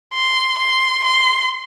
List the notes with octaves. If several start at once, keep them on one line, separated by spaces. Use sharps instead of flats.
C6
C6
C6